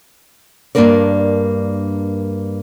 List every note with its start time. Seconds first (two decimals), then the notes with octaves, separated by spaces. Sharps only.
0.75 G2 D#3 A#3 D4 A#4 D5